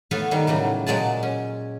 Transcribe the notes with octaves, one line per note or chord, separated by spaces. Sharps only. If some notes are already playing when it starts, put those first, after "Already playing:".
A3 B3 A4 B4 C#5 F5
D#3 G3
A2 C#3 F#3 G3
A#2 F#3 G#3 D5 A5
C#4